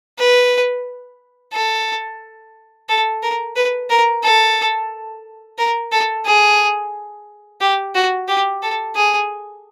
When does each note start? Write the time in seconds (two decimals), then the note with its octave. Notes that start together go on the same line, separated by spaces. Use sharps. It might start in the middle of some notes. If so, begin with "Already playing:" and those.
0.19 B4
1.53 A4
2.89 A4
3.23 A#4
3.56 B4
3.90 A#4
4.23 A4
5.58 A#4
5.92 A4
6.26 G#4
7.61 G4
7.95 F#4
8.28 G4
8.62 A4
8.96 G#4